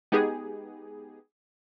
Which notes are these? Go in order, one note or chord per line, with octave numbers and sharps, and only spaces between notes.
G#3 B3 D#4 G4 G#4